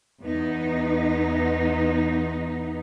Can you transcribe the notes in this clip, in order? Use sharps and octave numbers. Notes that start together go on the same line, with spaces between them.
E2 B3 D#4